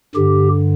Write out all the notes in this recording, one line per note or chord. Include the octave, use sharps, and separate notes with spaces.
G2 D3 G4